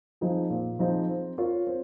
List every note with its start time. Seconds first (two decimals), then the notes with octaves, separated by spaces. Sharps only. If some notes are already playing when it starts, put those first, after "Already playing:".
0.21 F3 C4 D#4 G#4
0.50 A#2
0.79 F3 C4 D#4 G#4
1.09 C4
1.38 F4 A#4 C#5
1.67 C4